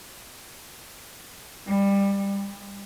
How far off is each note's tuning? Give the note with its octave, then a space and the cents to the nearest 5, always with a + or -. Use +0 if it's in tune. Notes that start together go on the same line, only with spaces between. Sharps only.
G3 +20
G3 +35